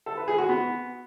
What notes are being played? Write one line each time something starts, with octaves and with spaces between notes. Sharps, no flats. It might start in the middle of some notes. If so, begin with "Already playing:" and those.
A4
B4
G#4
F#4
B3